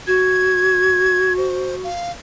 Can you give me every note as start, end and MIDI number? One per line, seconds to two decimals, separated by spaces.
0.07 1.89 66
0.07 1.33 92
1.38 1.75 72
1.84 2.11 77